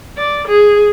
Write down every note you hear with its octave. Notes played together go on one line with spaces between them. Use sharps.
D5
G#4